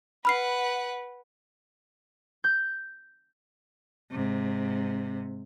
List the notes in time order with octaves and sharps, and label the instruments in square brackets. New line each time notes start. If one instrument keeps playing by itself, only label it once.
[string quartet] B4 F#5 [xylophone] B5 F6 C7
[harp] G6
[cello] G#2 C3